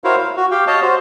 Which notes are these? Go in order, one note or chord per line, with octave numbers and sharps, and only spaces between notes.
E4 F#4 A#4 C5 C#5 F5
F5
F#4
G4 F5 G5
C#5 D#5 F5 A5
F#4 C5